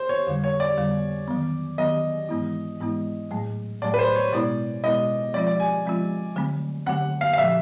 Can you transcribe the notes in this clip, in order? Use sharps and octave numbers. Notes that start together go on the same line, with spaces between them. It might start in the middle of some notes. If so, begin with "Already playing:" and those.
Already playing: C5
C#5
F2 D3 G3
C#5
D5
F2 D3 G3
D#3 F#3 B3
D#3 F#3 B3 D#5
G#2 E3 G#3 B3 E4
G#2 E3 G#3 B3 E4
A2 F#3 A3
A2 F#3 A3 D5
B4
C5
C#5
B2 G#3 B3 E4 D5
B2 G#3 B3 E4 D#5
F3 G#3 C4 F4 D5
D5
G#5
F3 G#3 C4 F4
D3 F#3 A3 C4
D3 F#3 A3 C4 F#5
F5
F5
A#2 F3 A3 E5